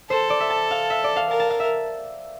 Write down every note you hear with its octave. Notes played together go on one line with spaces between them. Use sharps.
A4 C5
D5
E5
A5
F5
E5
D5
F5
A#4 A5
A5
F5
E5